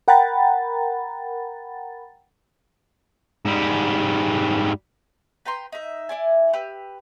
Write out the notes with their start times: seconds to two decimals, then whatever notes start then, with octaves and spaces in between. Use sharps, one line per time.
0.08 A#4 F#5 G5 A#5 B5 A6
3.45 G#2 G3
5.45 B4 G5 A#5 C6
5.72 D#4 E5
6.09 E4 D5 G#5
6.53 G4 B4 E6